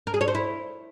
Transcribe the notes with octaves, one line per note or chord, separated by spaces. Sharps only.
A#4
G#4
C#5
C5
E4